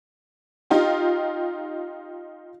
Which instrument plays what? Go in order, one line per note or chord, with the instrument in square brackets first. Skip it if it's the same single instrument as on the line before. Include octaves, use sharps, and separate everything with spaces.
[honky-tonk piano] D#4 F4 G4